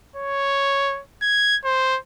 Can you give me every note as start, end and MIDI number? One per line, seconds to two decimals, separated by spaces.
0.16 1.01 73
1.22 1.57 92
1.64 1.98 72